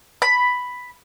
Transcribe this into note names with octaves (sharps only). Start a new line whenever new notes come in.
B5